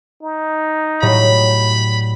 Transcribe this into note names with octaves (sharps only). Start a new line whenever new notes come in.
D#4
A2 F#3 G3 B5